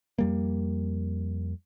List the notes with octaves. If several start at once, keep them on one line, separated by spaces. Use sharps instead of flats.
F2 G3 A#3